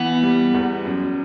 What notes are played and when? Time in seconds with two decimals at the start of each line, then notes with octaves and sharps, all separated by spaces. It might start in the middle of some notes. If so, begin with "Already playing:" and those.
Already playing: E3 B3
0.23 G3
0.54 E2
0.85 F#2